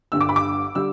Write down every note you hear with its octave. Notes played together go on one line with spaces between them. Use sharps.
G1 G2 D3 E6
D6
B5
D6
D3 G3 E6